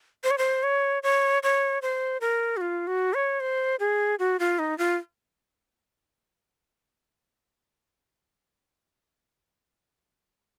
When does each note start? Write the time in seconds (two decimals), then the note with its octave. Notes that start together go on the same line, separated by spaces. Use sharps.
0.24 C5
0.31 C#5
0.38 C5
0.63 C#5
1.03 C#5
1.43 C#5
1.82 C5
2.21 A#4
2.57 F#4
2.61 F4
2.87 F#4
3.14 C#5
3.40 C5
3.80 G#4
4.19 F#4
4.40 F4
4.59 D#4
4.78 F4